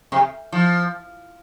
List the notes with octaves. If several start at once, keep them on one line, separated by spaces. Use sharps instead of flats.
C3
F3